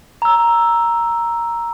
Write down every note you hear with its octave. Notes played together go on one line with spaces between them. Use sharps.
A#5 E6